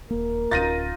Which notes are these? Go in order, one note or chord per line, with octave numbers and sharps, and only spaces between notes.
D#1 A#3 A#4
D1 C#4 D#4 F4 A6 A#6 D#7